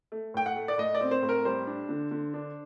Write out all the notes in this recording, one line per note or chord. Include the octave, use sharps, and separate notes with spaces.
A3
A2 G5
F#5
A3
D5
A2 D#5
D5
C4
C5
A2
A#4
G3 C5
D4
D3
D3
D4